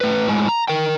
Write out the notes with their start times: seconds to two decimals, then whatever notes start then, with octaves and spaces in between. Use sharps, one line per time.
0.01 A3 B4
0.28 A2 G#3
0.49 A#5
0.68 A#4 G5